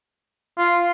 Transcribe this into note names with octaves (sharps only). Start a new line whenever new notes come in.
F4